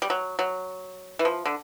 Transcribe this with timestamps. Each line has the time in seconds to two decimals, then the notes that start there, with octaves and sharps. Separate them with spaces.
0.02 G3
0.10 F#3
0.39 F#3
1.19 E3
1.25 F3
1.46 D3